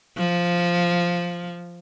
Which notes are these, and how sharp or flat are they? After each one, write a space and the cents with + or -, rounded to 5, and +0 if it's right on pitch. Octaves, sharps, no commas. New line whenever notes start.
F3 +0